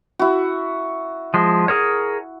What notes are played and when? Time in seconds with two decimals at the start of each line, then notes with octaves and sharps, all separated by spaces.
0.19 E4 F#4
1.34 F3 G#3
1.68 G#4 A#4 C#5